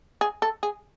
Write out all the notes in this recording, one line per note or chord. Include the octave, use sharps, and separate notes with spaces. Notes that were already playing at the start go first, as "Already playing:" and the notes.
G#4
A4
G#4